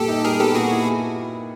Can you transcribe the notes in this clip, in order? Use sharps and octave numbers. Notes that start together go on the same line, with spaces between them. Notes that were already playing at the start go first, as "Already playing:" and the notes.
Already playing: A#2 G3 A#3 G4 A4
D#4
G3 G#4 A#4
B3 G4 A4
A#2 F#4 G#4
E4